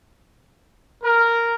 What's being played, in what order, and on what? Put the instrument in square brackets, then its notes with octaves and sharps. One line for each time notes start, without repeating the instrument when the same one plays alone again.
[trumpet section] A#4